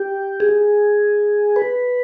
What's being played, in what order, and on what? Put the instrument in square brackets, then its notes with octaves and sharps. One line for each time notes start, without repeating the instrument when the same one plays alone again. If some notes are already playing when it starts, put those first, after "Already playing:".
Already playing: [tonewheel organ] G4
G#4
B4